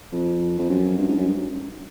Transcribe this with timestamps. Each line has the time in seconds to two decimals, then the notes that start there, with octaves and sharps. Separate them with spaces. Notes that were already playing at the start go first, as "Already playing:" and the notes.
0.12 F2
0.58 F2
0.69 F#2
0.98 G2
1.08 G#2
1.17 F#2
1.28 G2